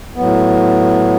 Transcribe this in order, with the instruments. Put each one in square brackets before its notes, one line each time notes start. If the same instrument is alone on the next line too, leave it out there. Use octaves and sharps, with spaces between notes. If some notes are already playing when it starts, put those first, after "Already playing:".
[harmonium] A2 F#3 B3